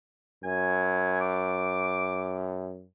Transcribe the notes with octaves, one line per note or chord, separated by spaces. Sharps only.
F#2 G#5
D6